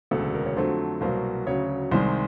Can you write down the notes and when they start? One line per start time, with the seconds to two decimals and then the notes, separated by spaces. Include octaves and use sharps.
0.11 E1 D2 C#3 A4
0.34 A#4
0.46 C#5
0.56 F2 D3 F#3 A3 C4 C5
1.01 C2 B2 F#3 A#3 C5
1.46 D2 C#3 F#3 C#5
1.92 C2 C3 D#3 G#3 C5